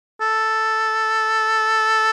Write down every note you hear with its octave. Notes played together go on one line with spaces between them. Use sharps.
A4